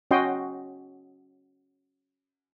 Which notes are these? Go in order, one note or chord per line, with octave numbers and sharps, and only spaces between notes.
C#4 F#4 D#5 G5 C6